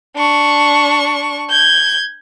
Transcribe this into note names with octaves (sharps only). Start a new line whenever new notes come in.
D4 C#6
G6 G#6